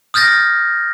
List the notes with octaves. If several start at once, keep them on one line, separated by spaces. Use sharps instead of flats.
D#6 F6 G6 A6 A#6